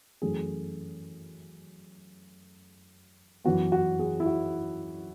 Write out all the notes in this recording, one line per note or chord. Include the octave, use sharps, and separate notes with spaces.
F#2 E3 A3 C#4 G#4
F#2 E3 B3 F#4
F#4
G#4
E4
F#4